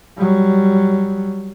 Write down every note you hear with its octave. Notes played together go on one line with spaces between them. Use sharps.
F#3 G3